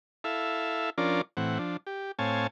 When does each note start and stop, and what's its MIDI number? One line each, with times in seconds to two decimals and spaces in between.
0.24 0.90 64
0.24 0.90 69
0.24 0.90 76
0.24 0.90 77
0.98 1.21 53
0.98 1.21 61
0.98 1.21 62
0.98 1.21 65
0.98 1.21 70
0.98 1.21 74
1.37 1.58 45
1.37 1.58 52
1.37 1.58 60
1.37 1.58 78
1.59 1.77 53
1.59 1.77 62
1.87 2.12 67
2.19 2.47 45
2.19 2.47 60
2.19 2.47 73
2.19 2.47 77
2.19 2.47 80
2.19 2.47 81